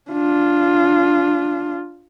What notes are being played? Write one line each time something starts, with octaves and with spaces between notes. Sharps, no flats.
D4 F4